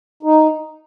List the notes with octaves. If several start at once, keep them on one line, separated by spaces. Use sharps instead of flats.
D#4